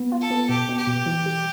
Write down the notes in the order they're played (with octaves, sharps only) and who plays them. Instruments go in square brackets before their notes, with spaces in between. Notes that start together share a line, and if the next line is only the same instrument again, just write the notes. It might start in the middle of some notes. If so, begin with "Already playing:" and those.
Already playing: [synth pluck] B3
F4
[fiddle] A4
[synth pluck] B3
[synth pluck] B2 [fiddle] G4
[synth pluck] B2
[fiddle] G4
[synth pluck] B2
E3
G3